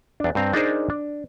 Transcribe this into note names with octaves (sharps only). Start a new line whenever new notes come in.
E2 D4
G2 C4 A#5
D4 D#4 G#4 A#4 C5 D5
D4